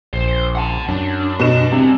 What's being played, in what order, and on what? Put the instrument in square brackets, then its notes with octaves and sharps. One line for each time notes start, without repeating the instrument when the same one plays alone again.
[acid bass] A#1 [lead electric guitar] C5
[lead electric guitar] F#5 A5
[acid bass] F#2 [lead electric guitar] D4
[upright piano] B2 E7
[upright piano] C3 [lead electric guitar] G3 C4